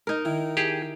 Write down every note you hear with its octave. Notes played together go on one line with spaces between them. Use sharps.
D#4 A#4
D#3 E4
G4 G#4